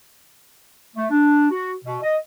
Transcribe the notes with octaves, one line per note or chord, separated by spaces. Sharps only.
A3
D4
F#4
B2
D#5